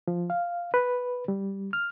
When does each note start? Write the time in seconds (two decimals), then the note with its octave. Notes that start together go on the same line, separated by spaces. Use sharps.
0.08 F3
0.30 F5
0.74 B4
1.28 G3
1.73 F6